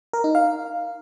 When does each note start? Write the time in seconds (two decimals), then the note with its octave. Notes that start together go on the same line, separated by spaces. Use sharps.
0.13 A#4
0.24 D#4
0.35 F5